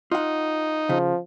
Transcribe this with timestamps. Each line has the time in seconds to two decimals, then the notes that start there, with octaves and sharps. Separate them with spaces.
0.11 D#4 F4 F#5
0.89 C#3 F3